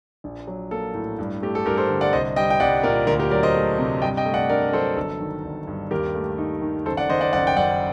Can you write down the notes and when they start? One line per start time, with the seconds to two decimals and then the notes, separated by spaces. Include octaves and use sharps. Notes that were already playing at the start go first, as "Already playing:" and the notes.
0.24 A#1
0.47 F#3
0.71 A#3 A4
0.94 A2
1.19 G2
1.42 A3 G4
1.55 A4
1.65 G2 G4 A#4
1.77 A4 C5
1.89 D3
2.01 D5 F#5
2.13 C2 C5 D#5
2.36 G3 D#5 G5
2.50 G5
2.60 C2 D5 F#5
2.83 A#2 A#4 D5
3.07 D2 A#4 D5
3.20 G4 A#4
3.31 F#3 A#4 D5
3.43 C5 D#5
3.55 A3
3.78 C3
4.02 G2 D#5 G5
4.17 D#5 G5
4.26 A3
4.34 D5 F#5
4.49 D4 A#4 D5
4.69 A#4
4.73 F#3 A4 C5
4.96 G1 A4
5.20 D#3
5.44 G1
5.67 G2
5.91 D#2 G4 A#4
6.15 A3
6.38 D#4
6.62 D#3
6.86 F#1 A4 C5
6.97 D5 F#5
7.10 D#3 C5 D#5
7.21 D5 F#5
7.33 F#1 D5 F#5
7.47 G5
7.57 F#2 D5 F#5